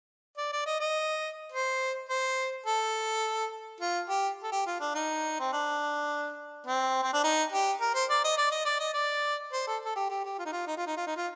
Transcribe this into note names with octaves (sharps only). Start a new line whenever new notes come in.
D5
D5
D#5
D#5
C5
C5
A4
F4
G4
A4
G4
F4
D4
D#4
C4
D4
C4
C4
D4
D#4
G4
A#4
C5
D5
D#5
D5
D#5
D5
D#5
D5
C5
A4
A4
G4
G4
G4
F4
D#4
F4
D#4
F4
D#4
F4
D#4
F4